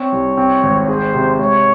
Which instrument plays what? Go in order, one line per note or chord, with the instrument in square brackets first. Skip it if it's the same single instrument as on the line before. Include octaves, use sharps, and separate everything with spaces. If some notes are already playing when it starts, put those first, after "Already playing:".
Already playing: [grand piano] C4 [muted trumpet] C#5
[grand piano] C2
C4
G#1
[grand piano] G#4 [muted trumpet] C5
[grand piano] C3
[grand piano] G#3 [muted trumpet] C#5